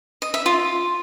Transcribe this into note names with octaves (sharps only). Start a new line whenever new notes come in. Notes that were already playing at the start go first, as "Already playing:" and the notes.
D#5
E5
F4